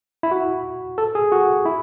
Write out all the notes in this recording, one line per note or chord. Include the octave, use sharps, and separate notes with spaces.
E4
F#4
A4
G#4
F#4
E4